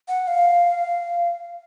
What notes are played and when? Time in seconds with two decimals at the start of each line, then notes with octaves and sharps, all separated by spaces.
0.08 F#5
0.27 F5